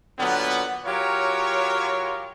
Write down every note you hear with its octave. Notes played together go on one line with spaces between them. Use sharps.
A#2 D3 F#3 B3
F#3 F4 G4 A#4 C#5